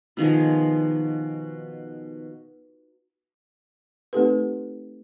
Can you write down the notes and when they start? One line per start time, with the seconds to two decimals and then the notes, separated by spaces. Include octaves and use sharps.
0.17 B2 D#3 F3 G#4
4.13 A3 C4 D#4 G4 A4 B4